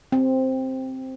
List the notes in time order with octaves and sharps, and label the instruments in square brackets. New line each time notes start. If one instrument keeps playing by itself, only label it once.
[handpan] C4